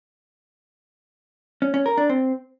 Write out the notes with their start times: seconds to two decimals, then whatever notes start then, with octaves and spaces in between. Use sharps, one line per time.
1.62 C#4
1.74 C#4
1.86 A#4
1.98 D4
2.09 C4